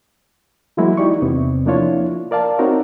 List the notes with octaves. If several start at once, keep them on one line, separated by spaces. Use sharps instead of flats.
E3 F#3 G#3 A#3 E4 F#4
D#4 E4 G4 D5 C#6
E2 C3 B3 C4
F3 A#3 D4 E4 F4 C#5
A#4 D5 F5 A5
C4 D#4 F#4 A#4 C#5